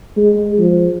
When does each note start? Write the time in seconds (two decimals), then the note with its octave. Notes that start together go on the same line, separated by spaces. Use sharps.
0.17 G#3
0.59 F3